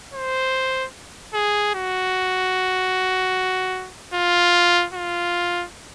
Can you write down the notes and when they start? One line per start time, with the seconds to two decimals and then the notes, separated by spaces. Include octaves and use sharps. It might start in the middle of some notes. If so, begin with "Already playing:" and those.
0.14 C5
1.34 G#4
1.74 F#4
4.14 F4
4.94 F4